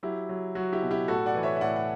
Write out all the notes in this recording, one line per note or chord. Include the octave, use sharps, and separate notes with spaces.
F#3 E4 G4
F#3
F#3 F#4
E4 G4
B2
E4 G4
A2 F#4 A4
D5 F#5
E3
C#5 E5
E5
A2 D5 F#5
F#5